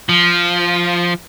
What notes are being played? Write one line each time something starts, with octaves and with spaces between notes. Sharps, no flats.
F3